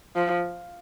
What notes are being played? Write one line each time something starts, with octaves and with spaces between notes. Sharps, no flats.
F3